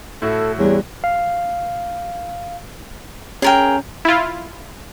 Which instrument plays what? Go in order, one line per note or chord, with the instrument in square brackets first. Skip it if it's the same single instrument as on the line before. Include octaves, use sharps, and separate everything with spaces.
[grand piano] A2 E4 F#4 [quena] A4
[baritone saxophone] E2 [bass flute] G3 [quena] C#5
[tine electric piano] F5
[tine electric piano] C#4 [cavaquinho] G#4 A#4 G5
[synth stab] E4 F4